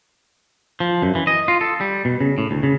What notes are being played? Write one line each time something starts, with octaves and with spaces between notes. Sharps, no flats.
F3
F#2
E3
D#5
F4
A4
G3
B2
C#3
A2
D2
C#3